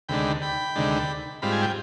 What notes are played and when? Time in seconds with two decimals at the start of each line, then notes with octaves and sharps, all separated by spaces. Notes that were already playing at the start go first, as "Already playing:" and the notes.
0.09 D2 C3 D#3 G#3 D4 G5 B5
0.42 G5 B5
0.75 D2 C3 D#3 G#3 D4
1.42 G#2 G3 C4 F4 B5
1.52 G#5
1.62 G5